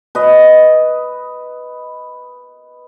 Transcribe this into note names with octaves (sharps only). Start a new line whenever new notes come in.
B4 D#5